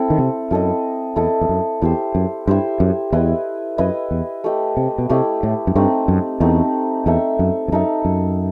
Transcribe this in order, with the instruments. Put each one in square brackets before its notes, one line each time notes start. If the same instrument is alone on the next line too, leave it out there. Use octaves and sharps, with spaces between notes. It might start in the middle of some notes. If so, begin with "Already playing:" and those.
Already playing: [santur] C4 E4 A4
[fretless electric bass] D#3
C3
[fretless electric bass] F#2 [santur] E4 A4 D#5
[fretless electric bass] E2 [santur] E4 A4 D#5
[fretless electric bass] E2
F#2
[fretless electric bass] E2 [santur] E4 G4 C5
[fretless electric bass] F#2
[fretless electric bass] G2 [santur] E4 G4 C5
[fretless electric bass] F#2
[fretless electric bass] E2 [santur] E4 B4 D#5
[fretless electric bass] F#2 [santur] E4 B4 D#5
[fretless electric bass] E2
[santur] A3 E4 G4 D#5
[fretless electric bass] C3
B2
[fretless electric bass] C3 [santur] A3 E4 G4 D#5
[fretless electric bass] A2
F#2
[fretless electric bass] G2 [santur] A3 C4 D#4
[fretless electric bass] F#2
[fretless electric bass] E2 [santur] A3 C4 D#4
[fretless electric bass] E2 [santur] D#4 A4 E5
[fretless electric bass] F#2
E2
[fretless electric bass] F#2 [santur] D#4 A4 E5
[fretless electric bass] F#2